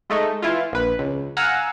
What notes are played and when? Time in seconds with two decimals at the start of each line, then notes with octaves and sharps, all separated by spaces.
0.10 G#3 A3 D#4
0.42 E3 E4 F4
0.72 A#1 B4
0.99 C#2
1.37 F5 F#5 G#5 A#5 E6